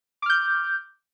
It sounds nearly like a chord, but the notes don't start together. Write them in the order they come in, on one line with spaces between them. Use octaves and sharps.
D6 F6 G6